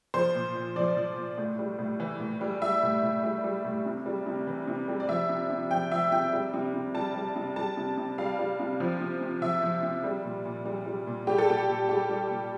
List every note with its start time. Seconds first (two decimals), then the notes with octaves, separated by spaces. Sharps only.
0.14 F3 C5
0.35 A#2
0.56 A#2
0.76 F3 D5
0.97 F3
1.17 A#2
1.38 A2
1.59 G3
1.79 A2
2.00 E3
2.20 A2
2.41 G3
2.62 G3 E5
2.82 A2
3.03 A2
3.23 G3
3.44 G3
3.65 A2
3.86 C3
4.06 G3
4.26 C3
4.47 E3
4.68 C3
4.88 G3
5.00 D5
5.09 F3 E5
5.29 C3
5.50 C3
5.71 F3 G5
5.91 F3 E5
6.12 C3 G5
6.33 G3
6.54 C3
6.74 C3
6.94 G3 A5
7.15 G3
7.36 C3
7.56 G3 A5
7.77 C3
7.97 C3
8.18 G3 F5
8.39 G3
8.60 C3
8.80 F3
9.01 C3
9.21 C3
9.42 F3 E5
9.63 F3
9.83 C3
10.04 G3
10.24 A#2
10.45 A#2
10.65 G3
10.86 G3
11.07 A#2
11.27 G3 G4
11.38 A4
11.48 A#2 G4
11.68 A#2
11.89 G3 G4
12.09 G3
12.30 A#2